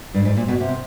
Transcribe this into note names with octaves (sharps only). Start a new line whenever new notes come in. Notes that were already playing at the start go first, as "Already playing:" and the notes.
G2
G#2
A#2
B2
C3